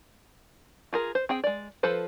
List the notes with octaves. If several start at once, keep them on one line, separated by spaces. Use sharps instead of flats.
F4 G#4 A#4
C5
C4 G#4 G5
G#3 D5
F3 A4 B4 C5